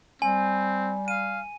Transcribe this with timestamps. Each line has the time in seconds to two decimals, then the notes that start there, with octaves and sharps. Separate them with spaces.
0.22 G3 C4 G#5
1.08 F5 D#7